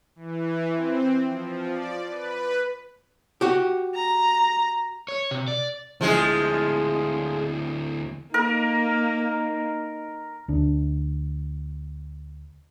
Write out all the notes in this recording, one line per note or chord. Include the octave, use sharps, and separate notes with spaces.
E3
C4
F3
D5
B4
F#4 G4
A#5
C#5
C3
D5
D2 F3 G#3 E4 G#4
A#3 D#4 A#4
D2 D4